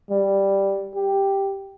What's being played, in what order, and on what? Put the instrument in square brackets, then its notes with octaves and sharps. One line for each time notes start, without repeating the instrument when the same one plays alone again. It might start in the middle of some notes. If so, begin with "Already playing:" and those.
[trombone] G3
G4